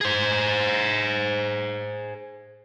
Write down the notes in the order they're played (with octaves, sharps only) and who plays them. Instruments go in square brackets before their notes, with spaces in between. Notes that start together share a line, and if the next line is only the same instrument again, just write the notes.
[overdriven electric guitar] G#4 C5